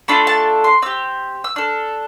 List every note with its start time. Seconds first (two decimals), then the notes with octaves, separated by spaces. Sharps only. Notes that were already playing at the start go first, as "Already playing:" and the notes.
0.08 A3 D4 F4 A4 B5
0.27 A5
0.64 C6
0.82 C4 G4 E6
1.44 E6
1.56 D4 A4 F6